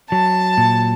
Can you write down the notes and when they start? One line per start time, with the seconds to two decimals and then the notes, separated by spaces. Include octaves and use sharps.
0.12 F#3 A5
0.58 A#2